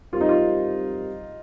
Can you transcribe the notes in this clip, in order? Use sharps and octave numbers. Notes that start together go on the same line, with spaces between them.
G3 C4 F4 G4 A#4
D#4
F4